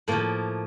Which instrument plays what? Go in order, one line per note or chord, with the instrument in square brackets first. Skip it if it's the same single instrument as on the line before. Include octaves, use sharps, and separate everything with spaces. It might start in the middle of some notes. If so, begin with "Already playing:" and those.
[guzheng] A2 F3 A#3